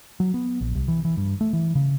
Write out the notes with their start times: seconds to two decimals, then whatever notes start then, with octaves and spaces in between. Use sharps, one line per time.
0.20 F#3
0.34 B3
0.61 A#1
0.75 C2
0.88 E3
1.05 E3
1.17 G2
1.41 A3
1.53 E3
1.75 C#3